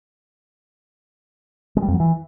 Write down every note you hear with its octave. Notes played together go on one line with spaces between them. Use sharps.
G#3
G3
F2
F#3
E3